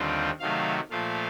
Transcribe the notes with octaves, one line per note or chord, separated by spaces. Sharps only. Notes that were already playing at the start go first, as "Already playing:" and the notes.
Already playing: D#2 D3 G3 C4 F4
C3 D#3 F#3 A3 F5
A#2 F3 A3 F5